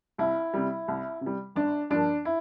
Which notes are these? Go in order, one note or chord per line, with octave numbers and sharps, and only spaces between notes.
C2 E4
C3 G3
C2
C3
G3
G1 D4
G2 F3 A#3 D4
E4